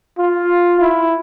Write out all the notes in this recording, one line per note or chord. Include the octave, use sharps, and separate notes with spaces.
F4
E4